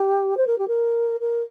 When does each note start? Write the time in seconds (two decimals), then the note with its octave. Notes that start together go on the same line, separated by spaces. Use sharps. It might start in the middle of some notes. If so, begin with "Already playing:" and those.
Already playing: G4
0.37 C5
0.47 A#4
0.58 G4
0.68 A#4
1.20 A#4